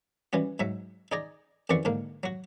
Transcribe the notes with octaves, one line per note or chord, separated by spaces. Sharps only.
E3 G3 C#4 F#4
G#2 F#3 E5
D#4 G#4 D5 A#5
F2 D#3 E3 F#4 D5 C#6
G#2 D3 A#3
F#3 F#4